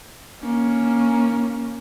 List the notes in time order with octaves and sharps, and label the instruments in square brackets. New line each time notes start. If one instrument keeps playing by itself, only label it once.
[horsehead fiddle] A#3 C#4